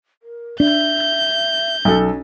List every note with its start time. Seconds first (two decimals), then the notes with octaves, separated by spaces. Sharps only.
0.23 A#4
0.60 D4 E5 G6
1.85 B1 C#4 A4